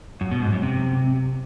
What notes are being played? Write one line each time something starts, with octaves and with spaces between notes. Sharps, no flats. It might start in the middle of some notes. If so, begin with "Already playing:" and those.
F#2
B2
G#2
F#2
C3